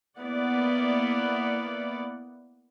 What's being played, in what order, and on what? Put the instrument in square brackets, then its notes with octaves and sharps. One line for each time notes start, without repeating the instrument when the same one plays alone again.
[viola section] A#3 B3 E4 D5 F#5